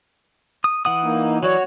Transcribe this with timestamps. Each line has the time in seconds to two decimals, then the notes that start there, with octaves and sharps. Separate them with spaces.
0.64 D#6
0.85 E3 F#5 D#6
1.04 A#3 D#4
1.43 E3 F#3 F#4 C#5 D5